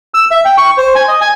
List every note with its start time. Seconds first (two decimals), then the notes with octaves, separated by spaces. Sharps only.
0.14 E6
0.31 E5
0.45 G5
0.58 C#6
0.77 C5
0.95 G#5
1.08 D#5
1.21 G#5